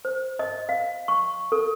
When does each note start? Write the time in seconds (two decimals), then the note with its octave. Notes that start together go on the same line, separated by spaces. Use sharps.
0.05 C5
0.39 D#5
0.69 F5
1.08 C#6
1.52 A4